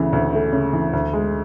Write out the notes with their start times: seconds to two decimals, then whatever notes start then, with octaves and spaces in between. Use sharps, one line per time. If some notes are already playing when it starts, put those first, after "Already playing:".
Already playing: D2 C#3 E3 A3
0.13 D2
0.33 A3
0.53 C#3
0.73 E3
0.93 D2
1.13 G#3